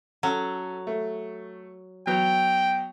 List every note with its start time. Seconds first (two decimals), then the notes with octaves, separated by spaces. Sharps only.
0.23 F#3 C#4 A4
0.87 A3
2.07 F#3 B3 G5